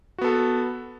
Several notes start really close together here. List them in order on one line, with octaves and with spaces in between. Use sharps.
F#4 B3 A4